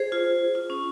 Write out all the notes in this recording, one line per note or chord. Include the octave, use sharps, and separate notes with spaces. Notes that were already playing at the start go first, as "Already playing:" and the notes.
Already playing: G#4 C5
F4 G#4
F4
C#4